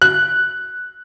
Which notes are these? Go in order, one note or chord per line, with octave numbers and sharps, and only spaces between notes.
F#6